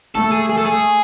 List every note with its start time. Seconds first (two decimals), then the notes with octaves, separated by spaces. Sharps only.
0.15 A3 A4
0.32 G#4
0.49 G#4
0.58 A4
0.66 G#4